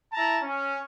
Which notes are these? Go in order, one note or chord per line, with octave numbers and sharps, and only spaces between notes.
E4 A5 A#5
C#4